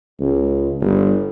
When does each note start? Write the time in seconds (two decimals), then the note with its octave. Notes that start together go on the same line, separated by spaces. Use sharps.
0.20 C#2
0.81 G1